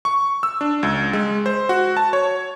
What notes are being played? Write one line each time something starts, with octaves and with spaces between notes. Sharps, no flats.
C#6
E6
D4
C#2
G#3
C5
F#4
A5
C#5